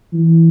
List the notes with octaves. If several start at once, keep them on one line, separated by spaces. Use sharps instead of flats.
E3